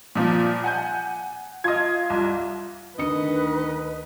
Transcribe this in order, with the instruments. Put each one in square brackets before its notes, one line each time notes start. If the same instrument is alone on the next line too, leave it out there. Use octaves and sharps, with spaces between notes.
[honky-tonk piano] A#2 F3
F#5 G#5 G6
[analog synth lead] F4 [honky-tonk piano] D#5 G#6
[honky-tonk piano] C2
[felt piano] D2 C#7 [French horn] D#3 [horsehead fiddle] B4 [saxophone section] D#5